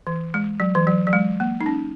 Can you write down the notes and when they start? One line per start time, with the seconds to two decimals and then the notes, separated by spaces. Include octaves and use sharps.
0.07 E3
0.34 G#3
0.60 F#3
0.75 E3
0.87 F#3
1.07 F#3
1.13 G#3
1.40 A#3
1.61 D#4
1.66 C#4